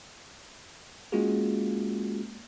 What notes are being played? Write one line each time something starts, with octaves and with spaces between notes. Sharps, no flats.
G#3 A#3 C#4 F4 F#4 G#4